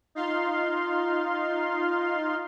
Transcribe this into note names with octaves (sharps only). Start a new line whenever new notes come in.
D#4 F4 F5 C6